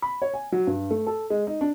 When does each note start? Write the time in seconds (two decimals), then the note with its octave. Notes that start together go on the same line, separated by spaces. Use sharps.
0.02 B5
0.22 C#5
0.34 G#5
0.52 F#3
0.67 G2
0.91 A3
1.07 A4
1.30 G#3
1.47 D#4
1.61 D4